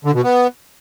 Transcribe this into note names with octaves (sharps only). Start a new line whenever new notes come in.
D3
B2
B3